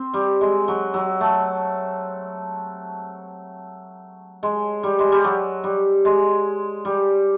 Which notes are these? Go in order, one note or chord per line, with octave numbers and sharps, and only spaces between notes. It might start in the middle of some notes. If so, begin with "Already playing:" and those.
Already playing: C4
G3
G#3
F#3
F#3
A3
G#3
G3
G#3
G3
F#3
G3
G#3
G3